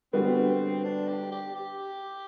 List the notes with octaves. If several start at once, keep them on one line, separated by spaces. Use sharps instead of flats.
D3 G3 B3 C4 F#4 B4
D4
G4
G4
G4